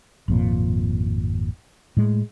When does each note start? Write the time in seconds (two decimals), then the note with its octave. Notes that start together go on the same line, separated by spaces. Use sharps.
0.28 G#1 F2 A#2
1.97 A2 G#3